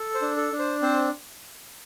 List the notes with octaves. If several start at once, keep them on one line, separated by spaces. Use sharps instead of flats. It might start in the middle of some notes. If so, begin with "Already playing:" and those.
Already playing: A4
C5
D4
A4
D4
C5
C4 C5